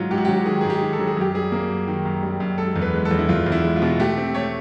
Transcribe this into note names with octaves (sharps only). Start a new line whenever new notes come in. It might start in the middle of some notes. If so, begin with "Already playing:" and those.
Already playing: G#2 F#3 F4
G#2 G4
F#4
F#3 G4
D#3 G#4
G#2 G#4
G4
D#3
A4
F#3
G#4
F#2 G4
G3 G#4
A#3
F#2
D#3
F#2
G3
F#2
G#3 A4
E2
B4
G#3
A4
E2
E4
E2 F4
E2
E4
G#3
F4
B2
A3 G4
C4
A3 C#5